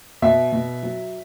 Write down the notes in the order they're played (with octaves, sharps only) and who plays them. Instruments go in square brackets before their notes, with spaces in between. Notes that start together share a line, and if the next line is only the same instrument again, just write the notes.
[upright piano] B2 E5
B2
F#3